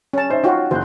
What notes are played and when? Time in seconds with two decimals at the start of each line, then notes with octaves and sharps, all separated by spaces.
0.13 C#4 A5
0.29 D#4 C5 E5
0.44 D#4 F4 F#4 C#5 G5
0.71 F#1 C5 F#6